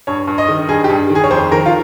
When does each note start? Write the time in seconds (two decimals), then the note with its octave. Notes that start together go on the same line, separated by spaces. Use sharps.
0.07 G2 C#5
0.27 G2
0.38 D#5
0.49 D#3
0.69 G2 G#4
0.84 G4
0.90 G2
1.10 D#3
1.15 G#4
1.24 C#5
1.31 F2 C5
1.52 D#3 A#4
1.66 F4